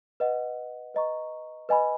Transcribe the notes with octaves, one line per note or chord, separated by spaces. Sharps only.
B4 D#5 F#5
B4 D#5 A#5 C#6
B4 D#5 G#5 B5